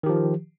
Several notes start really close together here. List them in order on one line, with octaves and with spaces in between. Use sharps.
D#3 G4 F3